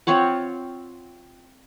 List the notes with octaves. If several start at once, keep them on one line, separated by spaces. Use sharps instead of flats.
C4 F4 C#5 F#5